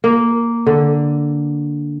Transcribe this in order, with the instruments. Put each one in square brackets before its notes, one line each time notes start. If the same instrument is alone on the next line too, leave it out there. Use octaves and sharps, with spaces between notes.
[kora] A#3
D3